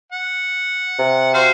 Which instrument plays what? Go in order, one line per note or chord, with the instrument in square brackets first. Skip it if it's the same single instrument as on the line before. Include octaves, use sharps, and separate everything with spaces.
[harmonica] F#5
[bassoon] C3
[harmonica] F#4 C5 F5